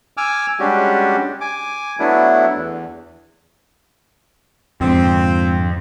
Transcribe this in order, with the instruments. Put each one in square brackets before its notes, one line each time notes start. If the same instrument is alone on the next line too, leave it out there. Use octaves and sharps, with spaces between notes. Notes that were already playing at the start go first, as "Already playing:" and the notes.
[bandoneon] G#5 D6 E6 F6
G3 G#3 C#4 D4 F#4 G4
G#5 D6
F#3 A3 B3 D4 E4
E2
[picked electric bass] F2 [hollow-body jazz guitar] G#2 D3 F3 [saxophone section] C4